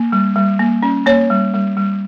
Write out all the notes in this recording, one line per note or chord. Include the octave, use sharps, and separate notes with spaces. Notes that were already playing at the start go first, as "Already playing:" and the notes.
Already playing: A#3
G3
G3
A#3
C#4
A#3 C#5
G3
G3
G3